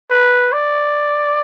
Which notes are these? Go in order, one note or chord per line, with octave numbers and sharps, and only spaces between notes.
B4
D5